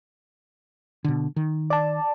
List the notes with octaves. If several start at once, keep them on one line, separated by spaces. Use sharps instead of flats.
B2 D3
D#3
D5 A5